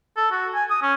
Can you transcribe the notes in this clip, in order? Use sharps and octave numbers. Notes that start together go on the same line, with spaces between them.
A4
F#4
G#5
D#6
C#4